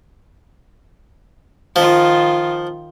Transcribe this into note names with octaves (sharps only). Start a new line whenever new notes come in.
D#3 F3 F4